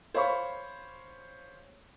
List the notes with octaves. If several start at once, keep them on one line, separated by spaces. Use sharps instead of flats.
C5 C#5 F5 B5 C#6